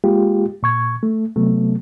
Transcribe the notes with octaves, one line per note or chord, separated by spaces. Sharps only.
G#3 A#3 F4 G4
A#2 C#6 G#6
A3
C3 F#3 A3 B3